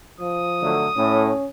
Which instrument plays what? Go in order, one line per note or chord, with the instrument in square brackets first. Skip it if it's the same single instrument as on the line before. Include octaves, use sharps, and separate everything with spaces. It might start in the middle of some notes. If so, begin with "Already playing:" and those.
[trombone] F3 [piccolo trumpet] D#6
[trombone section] D3 F#3 A3
[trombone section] A2 [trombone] C#4